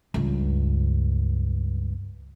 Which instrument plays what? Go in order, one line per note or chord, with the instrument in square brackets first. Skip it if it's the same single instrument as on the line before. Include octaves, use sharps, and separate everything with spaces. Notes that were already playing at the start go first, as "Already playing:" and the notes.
[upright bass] C#2 G2